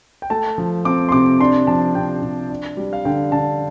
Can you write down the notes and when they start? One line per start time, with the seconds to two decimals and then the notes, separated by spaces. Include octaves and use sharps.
0.22 G5
0.30 A3 A5
0.58 F3
0.85 C4 D6
1.09 C6
1.12 C3 D6
1.41 D4 C6
1.67 F3 A5
1.95 C3 G5
2.22 C3
2.50 D4
2.77 G3
2.93 F5
3.05 D3 G5
3.32 D3 A5